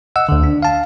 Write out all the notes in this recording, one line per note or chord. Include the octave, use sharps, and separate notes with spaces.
D#5 F#5 E6
D2 D3
D4
F5 A5